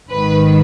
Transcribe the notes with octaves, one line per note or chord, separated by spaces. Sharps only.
G#1 G#2 D#3 B4